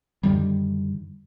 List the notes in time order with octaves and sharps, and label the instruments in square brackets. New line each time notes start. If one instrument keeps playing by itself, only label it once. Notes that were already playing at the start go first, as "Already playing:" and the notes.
[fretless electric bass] F#2 D3 D#3 G3